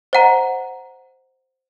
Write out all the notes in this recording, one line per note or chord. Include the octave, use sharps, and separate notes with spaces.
C5 D#5 F#5 A#5